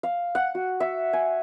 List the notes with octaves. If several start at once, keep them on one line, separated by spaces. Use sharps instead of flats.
F5
F#5
F#4
E5
G#5